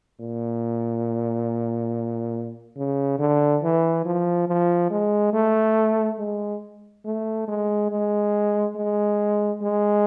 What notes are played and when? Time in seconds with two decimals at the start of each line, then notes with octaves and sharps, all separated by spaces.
0.20 A#2
2.77 C#3
3.19 D3
3.63 E3
4.06 F3
4.48 F3
4.90 G#3
5.33 A3
6.19 G#3
7.05 A3
7.48 G#3
7.90 G#3
8.76 G#3
9.62 G#3